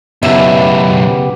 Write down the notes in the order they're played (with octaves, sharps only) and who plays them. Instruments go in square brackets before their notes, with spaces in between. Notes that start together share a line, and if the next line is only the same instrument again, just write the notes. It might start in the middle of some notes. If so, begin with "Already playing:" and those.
[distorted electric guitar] B1 F#2 [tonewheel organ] C#3 B3 G4 [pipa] E4